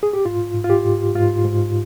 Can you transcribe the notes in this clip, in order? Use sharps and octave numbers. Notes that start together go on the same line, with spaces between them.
G#4
G4
G#2 F4
G#2
F4
G4
G#2
G#2 F4
G#2